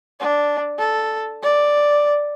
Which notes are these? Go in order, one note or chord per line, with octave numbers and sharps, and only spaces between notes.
D4
A4
D5